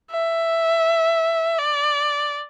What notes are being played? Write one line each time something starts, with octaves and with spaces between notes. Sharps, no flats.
E5
D5